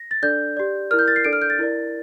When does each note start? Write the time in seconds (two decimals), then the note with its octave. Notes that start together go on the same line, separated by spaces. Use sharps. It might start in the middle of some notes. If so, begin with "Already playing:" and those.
Already playing: A#6
0.11 A6
0.23 D4 A4 D5 G6
0.57 G4 D5
0.90 E4 A#4 D5 F6
0.99 G6
1.08 A6
1.16 C7
1.25 D4 A4 D5 D7
1.33 F6
1.42 G6
1.50 A6
1.59 E4 A#4 D5